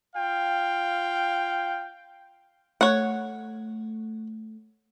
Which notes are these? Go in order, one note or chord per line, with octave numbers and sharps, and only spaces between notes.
F4 F5 G5
A3 C#5 F#5